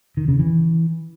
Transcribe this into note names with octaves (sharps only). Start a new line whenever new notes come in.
D#3
C#3
E3